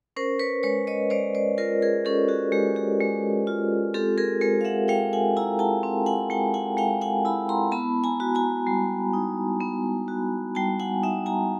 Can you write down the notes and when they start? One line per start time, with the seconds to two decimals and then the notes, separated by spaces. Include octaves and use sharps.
0.16 C#4 A#4 C5
0.39 B4 C#5
0.63 G#3 B4 C#5
0.87 C#5 D#5
1.10 G#3 C5 D5
1.35 C5 D5
1.58 F4 A#4 C5
1.82 G#4 A#4
2.05 C#4 G4 A4
2.28 F#4 G#4
2.52 G#3 G4
2.76 G4
3.00 G#3
3.47 F4
3.94 C4 G4 A4
4.18 G#4 A#4
4.41 G#3 A#4 C5
4.61 F5
4.65 E5 F#5
4.88 G#3 F5 G5
5.13 F#5 G#5
5.37 E4 G#5 A#5
5.59 G5 A5
5.83 C4
6.06 F#5 G#5
6.30 G#3 G5 A5
6.54 F#5 G#5
6.77 G#3 F5 G5
7.01 F#5 G#5
7.25 E4 A5 B5
7.49 A#5 C6
7.72 B3 A5 B5
8.04 G#5 A#5
8.20 F#4
8.35 G#5 A#5
8.67 G3
9.13 D#4
9.61 B3
10.08 F#4
10.55 G3 G5 A5
10.80 F#5 G#5
11.03 D#4 E5 F#5
11.26 G#5 A#5